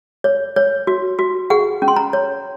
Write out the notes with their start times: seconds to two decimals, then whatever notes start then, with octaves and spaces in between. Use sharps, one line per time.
0.24 C#5
0.56 C#5
0.87 F#4
1.19 F#4
1.50 G#4 F#5
1.82 C#4
1.88 C6
1.96 A#5
2.13 C#5